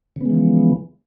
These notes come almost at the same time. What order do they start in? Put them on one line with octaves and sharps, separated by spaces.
C#3 B3 G#3 E3 F3